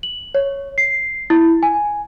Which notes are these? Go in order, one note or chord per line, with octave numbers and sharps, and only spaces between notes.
F#7
C#5
C7
E4
G#5